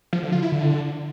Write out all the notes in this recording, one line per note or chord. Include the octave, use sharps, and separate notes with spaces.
F3
D3
F4
E4
D3